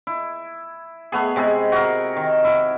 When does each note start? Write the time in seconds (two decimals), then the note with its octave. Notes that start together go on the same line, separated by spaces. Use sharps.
0.07 E4
1.12 A3 B3 G#4
1.36 C3 G#3 E4 G#4
1.72 F#4 A#4
2.16 D#3
2.44 E4